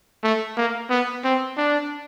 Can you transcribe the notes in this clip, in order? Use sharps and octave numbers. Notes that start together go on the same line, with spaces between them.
A3
A#3
B3
C4
D4